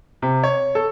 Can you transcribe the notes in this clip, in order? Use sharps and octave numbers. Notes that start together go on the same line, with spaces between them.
C3
C#5
A4